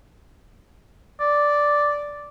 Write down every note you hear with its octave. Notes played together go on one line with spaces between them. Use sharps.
D5